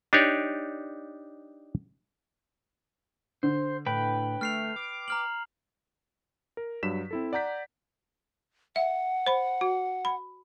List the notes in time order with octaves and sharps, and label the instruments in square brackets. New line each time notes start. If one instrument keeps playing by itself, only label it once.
[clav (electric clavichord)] D4 D#4 G4 C#5 D5
[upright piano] D3 [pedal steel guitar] C5
[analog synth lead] A2 [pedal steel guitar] B4 G5 B5
[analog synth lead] A3 [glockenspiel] F6 C7 F7
[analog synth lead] D6
[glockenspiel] A#5 F6 F#7
[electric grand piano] A#4
G2 F#3 B6 E7
C4 E4 A4
D5 F#5 A#5 G6 B6
[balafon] E5 [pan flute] F#5
[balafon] C5 B5
F#4
B5